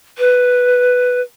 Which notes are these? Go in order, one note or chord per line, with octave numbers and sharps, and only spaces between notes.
B4